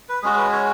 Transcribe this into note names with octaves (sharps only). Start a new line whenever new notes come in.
B4
G#3 C#4 F#4 G#4
B4
C#5